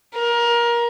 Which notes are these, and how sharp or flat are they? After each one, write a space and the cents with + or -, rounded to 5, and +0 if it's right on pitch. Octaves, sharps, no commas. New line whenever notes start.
A#4 +25